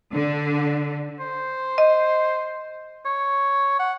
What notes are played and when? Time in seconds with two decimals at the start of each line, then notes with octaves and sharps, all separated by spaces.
0.14 D3
1.20 C5
1.78 D#5
3.05 C#5
3.79 F#5